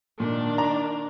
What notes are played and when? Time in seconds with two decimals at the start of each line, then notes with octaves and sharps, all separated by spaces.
0.20 A#2 D#3 D4
0.58 A#5